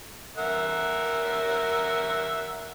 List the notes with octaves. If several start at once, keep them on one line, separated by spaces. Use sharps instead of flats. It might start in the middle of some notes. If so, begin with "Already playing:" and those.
A#4 E5 F#5